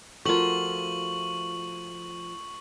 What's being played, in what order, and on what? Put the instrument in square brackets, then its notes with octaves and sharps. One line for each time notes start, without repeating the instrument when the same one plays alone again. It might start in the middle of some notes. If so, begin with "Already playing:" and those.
[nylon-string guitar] F3 F#4 A#4 [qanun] A3 F4 [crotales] C#6 F#7